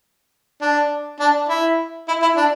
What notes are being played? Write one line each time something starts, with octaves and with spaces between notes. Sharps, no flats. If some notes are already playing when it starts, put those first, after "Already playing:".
D4
D4
E4
E4
E4
D4